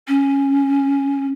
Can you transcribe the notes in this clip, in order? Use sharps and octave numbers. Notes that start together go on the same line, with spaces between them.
C#4